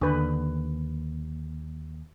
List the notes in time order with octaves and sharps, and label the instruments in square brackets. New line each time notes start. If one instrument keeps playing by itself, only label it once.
[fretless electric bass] D#2 [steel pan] D3 B4